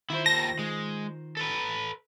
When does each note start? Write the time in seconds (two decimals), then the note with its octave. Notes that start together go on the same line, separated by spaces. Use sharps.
0.10 D#3 E4 F4 C5
0.26 D#2 A5 A#6
0.59 G#3
1.37 A4 B4